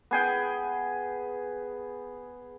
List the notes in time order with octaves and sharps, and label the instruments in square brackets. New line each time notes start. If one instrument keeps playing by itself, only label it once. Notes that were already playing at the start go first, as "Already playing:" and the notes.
[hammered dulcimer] B3 G#4 G5